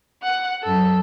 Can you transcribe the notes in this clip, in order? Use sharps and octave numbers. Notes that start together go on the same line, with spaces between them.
F#5 F#6
F#2 A4